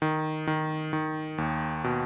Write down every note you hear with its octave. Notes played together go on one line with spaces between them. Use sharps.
D#3
D#3
D#3
D#2
B2